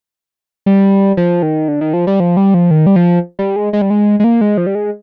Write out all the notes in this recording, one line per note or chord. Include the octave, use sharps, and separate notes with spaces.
G3
F3
D#3
D3
D#3
F3
G3
F3
G3
F3
D#3
G3
F3
G3
G#3
G#3
G3
G#3
G#3
A#3
G#3
F3
G3
G#3